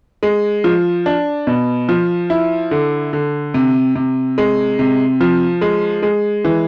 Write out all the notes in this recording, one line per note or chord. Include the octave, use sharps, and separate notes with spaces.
G#3
F3
D4
B2
F3
E4
D3
D3
C3
C3
G#3
C3
F3
G#3
G#3
E3